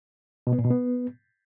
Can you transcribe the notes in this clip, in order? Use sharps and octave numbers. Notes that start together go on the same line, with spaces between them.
B2
B3
A#2
B2
B3